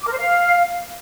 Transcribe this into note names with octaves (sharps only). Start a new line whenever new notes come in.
D6
A#4
C5
F5